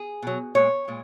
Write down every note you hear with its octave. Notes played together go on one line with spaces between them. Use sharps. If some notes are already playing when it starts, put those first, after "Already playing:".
Already playing: G#4
B2 F#3
A#2 G#3 C#5
A#2 G#3